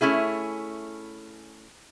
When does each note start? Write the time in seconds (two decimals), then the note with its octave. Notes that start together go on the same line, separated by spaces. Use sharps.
0.01 A3 C#4 E4 G#4